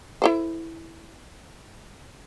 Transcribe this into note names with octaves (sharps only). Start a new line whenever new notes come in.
E4 A4 C5